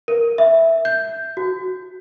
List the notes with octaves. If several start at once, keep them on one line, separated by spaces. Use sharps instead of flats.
A#4
E5
G6
F#4